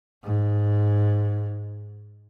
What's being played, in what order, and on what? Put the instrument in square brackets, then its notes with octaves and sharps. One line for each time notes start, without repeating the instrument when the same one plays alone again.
[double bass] G#2